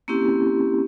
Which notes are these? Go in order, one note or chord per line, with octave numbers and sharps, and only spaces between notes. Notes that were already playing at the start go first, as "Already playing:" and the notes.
A#3 C4 C#4 E4 G4